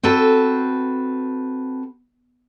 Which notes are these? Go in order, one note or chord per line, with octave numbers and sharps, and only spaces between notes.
C4 F#4 A4 B4